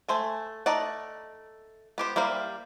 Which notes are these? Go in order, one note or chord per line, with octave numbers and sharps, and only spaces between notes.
A3 C5 G#5
A3 D#4 D5 F#5
B3 G4 C5
G3 A#3 E4 C5